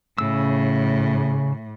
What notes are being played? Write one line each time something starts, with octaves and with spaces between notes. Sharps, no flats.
A2 C#3 E6